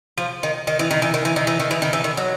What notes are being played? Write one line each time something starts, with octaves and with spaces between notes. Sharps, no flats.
F3
D#3
D#3
E3
D#3
E3
D#3
E3
D#3
E3
D#3
E3
D#3
E3
D#3
F#3